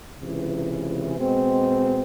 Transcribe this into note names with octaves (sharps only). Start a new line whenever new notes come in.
C#2 C3 E3
B2 G#3 C4